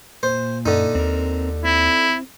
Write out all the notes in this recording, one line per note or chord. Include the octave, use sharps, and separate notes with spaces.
A#2 C5
F#2 D3 D#4
D#2 C4 A#4
C4 E4